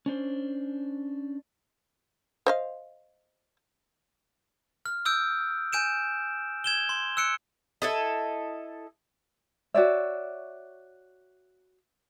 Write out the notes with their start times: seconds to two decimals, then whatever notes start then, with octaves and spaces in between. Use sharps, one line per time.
0.06 C#4 D4 C5
2.47 C5 D#5 F5
4.86 F6
5.05 D#6 E6 G6 D7
5.73 G#5 G6 D7 E7
6.64 G#6 E7 G7
6.89 C6
7.17 E6 F#6 C#7 D7
7.82 E4 A4 D#5
9.74 F#4 C#5 D5 E5